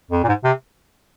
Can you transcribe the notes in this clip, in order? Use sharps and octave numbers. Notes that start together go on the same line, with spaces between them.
F2
A#2
G#2
C3